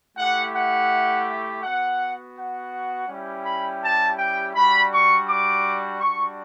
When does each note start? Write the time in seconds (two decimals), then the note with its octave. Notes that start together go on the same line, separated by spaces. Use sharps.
0.17 A3 E4 G4 F#5
0.53 F#5
1.63 B3 F#4 F#5
2.36 F#5
3.08 G3 C#4 E4 G4
3.45 B5
3.81 A5
4.18 G5
4.54 G3 D4 F#4 B5
4.91 C#6
5.27 D6
6.00 G3 D4 F#4 C#6